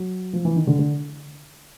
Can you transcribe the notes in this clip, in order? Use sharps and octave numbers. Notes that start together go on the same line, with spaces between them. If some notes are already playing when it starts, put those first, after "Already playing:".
Already playing: F#3
F3
E3
D#3
D3
D3